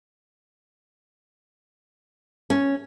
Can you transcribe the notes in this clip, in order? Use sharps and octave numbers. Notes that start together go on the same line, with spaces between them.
C#4